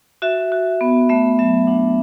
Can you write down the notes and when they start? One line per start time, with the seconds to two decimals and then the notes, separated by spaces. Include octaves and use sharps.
0.22 F#4 E5
0.52 F#4
0.81 B3
1.09 A3 E5
1.39 F#3 E5
1.67 D4 F#5